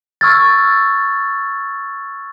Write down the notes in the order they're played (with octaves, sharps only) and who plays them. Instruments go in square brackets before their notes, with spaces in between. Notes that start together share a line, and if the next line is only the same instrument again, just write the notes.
[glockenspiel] C#6 E6 F6 G#6 A6